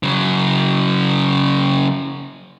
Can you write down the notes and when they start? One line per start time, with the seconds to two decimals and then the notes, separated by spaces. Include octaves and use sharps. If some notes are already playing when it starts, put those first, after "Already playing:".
0.03 C#3 F#3